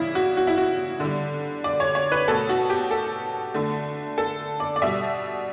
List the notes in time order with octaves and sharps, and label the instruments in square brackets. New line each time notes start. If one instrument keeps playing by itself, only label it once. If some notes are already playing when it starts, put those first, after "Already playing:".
Already playing: [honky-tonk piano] C#3 E3 G3 E4
F#4
F#4
E4
F#4
D3 G3
D5
C#5
C#5
B4
B2 A3 A4
F#4
G4
A4
D3 A3
A4
D5
D5
B2 G3 E5